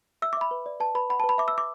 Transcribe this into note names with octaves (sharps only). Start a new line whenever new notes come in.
E5 E6
D6
E5 B5
B4
D5
B4 A5
B4 B5
F#5 B5
A5
B4
B5
E5 D6
E6
E5 D6